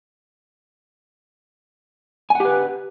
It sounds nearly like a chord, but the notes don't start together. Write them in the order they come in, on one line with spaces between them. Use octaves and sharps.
G#5 F#5 G4 B4